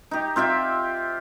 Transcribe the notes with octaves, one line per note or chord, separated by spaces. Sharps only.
D#4 G4
C4 F4 G4 E5